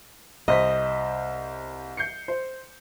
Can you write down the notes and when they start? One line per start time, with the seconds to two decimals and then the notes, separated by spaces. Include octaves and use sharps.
0.48 C2 C5 D#5 B6
1.97 G6 C7 C#7
2.28 C5